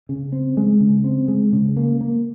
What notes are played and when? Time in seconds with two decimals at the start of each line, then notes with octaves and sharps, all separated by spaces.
0.09 C#3
0.32 C4
0.57 G#3
0.80 C#3
1.04 C4
1.28 G#3
1.53 C#3
1.77 A#3
2.01 A#3